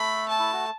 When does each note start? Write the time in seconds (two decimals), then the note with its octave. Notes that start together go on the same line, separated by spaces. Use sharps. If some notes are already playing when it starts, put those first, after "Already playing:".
Already playing: A3 A4 B5
0.28 A5
0.39 E4
0.53 F#4